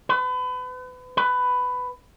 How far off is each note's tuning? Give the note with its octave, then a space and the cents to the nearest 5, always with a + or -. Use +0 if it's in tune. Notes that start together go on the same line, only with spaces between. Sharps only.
B4 +35
B4 +15